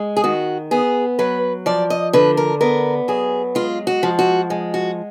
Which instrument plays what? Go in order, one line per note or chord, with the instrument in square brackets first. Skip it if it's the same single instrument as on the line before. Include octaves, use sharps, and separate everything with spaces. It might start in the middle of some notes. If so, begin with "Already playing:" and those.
Already playing: [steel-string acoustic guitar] G#3
G#4
D#3 F#4
B3 G#4
F#3 B4
F3 D5
D#5
D3 B4
A#4
B3 A#4
F#3 G#4
G#3 F4
F#4
F3
F#4
G#3
F#4